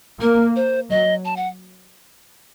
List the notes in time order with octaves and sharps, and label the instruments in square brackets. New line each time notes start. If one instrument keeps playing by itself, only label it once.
[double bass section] A#3 [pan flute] A#4
[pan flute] C5
[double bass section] F#3 [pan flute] D#5
[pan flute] A5
F#5